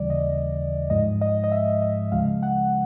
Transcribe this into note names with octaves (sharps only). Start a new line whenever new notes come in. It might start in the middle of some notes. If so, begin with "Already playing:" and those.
Already playing: D#2 C#3 E3 G3 D5
D#5
G#2 F3 G#3 D#5
D#5
D#5
E5
D#5
C#2 C#3 F3 G#3 F5
F#5